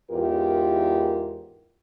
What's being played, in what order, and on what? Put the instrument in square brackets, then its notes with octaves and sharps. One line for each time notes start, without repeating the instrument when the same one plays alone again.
[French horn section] E2 G#2 F4 G4 A#4